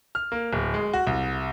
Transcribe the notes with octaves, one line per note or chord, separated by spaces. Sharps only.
F6
A#3
D1
G#3
F#4
C2